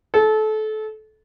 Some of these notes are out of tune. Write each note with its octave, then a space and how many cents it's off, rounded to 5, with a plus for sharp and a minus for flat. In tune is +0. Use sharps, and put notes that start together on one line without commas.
A4 -25